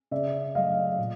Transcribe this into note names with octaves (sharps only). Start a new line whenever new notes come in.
C#3 D5 E5
F#3 A3 D#5 F5
A#2